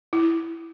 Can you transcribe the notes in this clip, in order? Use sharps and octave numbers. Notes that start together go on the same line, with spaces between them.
E4